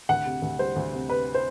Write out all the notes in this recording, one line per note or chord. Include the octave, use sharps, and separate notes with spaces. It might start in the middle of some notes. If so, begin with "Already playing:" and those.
D2 F#5
C3
D2
G3 C5
D2
C3
C3 B4
C5